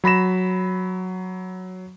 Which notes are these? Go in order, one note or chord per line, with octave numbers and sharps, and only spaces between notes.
F#3 B5 A#6 E7